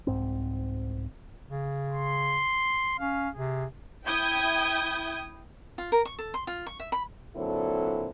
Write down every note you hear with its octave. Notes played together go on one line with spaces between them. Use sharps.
C2 G#2 C4
C#3
C6
C#4 F5
C3 G#4
E4 G5 D#6 G6 G#6
F4
A#4
C#6
A4
C6
F4
C#6
E5
B5
A#2 D3 F#3 C4 E4 A4